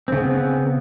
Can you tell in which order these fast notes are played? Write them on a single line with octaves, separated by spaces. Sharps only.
C4 C#3 B3